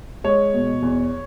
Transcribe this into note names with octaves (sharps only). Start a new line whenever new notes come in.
G#3 C#5
B2
E2